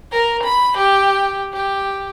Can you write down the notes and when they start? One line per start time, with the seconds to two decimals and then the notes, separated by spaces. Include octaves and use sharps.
0.12 A#4
0.43 B5
0.78 G4
1.53 G4